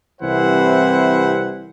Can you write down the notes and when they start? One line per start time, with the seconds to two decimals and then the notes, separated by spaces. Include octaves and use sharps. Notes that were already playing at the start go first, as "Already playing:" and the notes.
0.22 C2 C3 E3 E4 C5 F#5